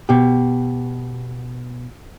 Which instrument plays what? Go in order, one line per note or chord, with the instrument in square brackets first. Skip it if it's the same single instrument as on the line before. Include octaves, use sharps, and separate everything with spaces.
[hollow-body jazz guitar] B2 G4